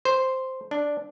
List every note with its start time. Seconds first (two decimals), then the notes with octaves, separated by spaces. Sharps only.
0.05 C5
0.71 D4